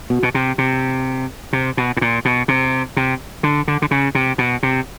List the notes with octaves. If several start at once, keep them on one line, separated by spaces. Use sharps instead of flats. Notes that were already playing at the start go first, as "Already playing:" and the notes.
B2
B2
C3
C3
C3
B2
A2
A#2
B2
C3
C3
D3
D3
D3
C#3
C3
B2
C3